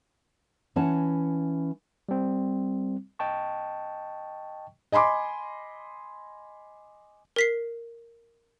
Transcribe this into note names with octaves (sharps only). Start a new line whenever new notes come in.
E3 C#4 F#5 A5
G3 C4
D#5 G5 A5 C#6
D#5 G#5 B5 C6 D6
A#4 B6 C7